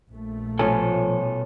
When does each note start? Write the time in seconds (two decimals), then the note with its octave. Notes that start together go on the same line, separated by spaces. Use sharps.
0.11 A#1 A3
0.59 B2 F3 C#4 F4 A4 G#5